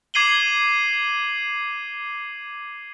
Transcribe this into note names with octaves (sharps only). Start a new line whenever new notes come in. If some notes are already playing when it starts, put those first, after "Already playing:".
D6 G#6 C7 D#7 F#7 G7